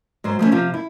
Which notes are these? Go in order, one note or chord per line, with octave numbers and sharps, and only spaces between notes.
G#2 F#3 C5
F3 A3 A#3 C#4
C3 F3 F4
E4